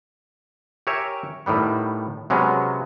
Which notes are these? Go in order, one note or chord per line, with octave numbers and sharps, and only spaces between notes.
G4 A#4 C#5 E5 G#5
A2 D#3 G3 B3
C3 F#3 G#3 B3 C#4